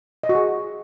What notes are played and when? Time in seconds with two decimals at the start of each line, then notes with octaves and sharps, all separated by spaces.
0.23 D#5
0.29 F#4
0.35 G#4